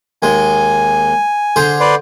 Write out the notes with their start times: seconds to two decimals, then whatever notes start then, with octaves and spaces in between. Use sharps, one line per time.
0.22 D#2 G#3 G#5
1.56 D3 G#4 C5
1.80 B4 D5 C6